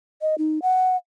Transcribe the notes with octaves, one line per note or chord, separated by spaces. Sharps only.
D#5
D#4
F#5